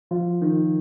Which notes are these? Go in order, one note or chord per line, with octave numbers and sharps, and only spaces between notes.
F3 F4
D#3